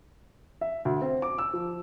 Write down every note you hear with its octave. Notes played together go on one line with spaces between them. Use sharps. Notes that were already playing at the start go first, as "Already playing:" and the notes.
E5
D2
C4
D6
E6
F3